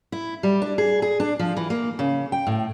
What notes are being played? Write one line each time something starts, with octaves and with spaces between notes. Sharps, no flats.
E4
G3
D4
G#4
G#4
D4
F3
E3
A#3
C#3
G5
A2